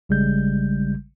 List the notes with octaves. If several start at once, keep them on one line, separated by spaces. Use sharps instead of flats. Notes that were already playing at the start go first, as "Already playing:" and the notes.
A1 C#3 G3 G#3 G6